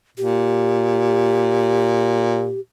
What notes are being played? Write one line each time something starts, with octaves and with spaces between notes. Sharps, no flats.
A#2 G4